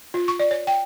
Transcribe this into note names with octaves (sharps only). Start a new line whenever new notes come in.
F4
C#6
D5
C#5
G5